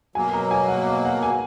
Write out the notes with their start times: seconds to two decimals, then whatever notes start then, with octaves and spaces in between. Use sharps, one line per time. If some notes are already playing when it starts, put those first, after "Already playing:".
0.15 B2 F#3 A#3 G#5
0.34 A#5
0.51 G#5
0.68 F#5
0.87 F5
1.05 F#5
1.23 G#5